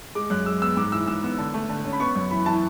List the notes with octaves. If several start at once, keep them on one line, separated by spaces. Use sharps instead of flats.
G#3 D6
F#2 F#6
G#3 E6
B3 E6
G#2 D6
E3 E6
G#2 E6
B3
D3
A3
D3
C#4
B5
B3 C#6
F#2
E3 B5
E3 A5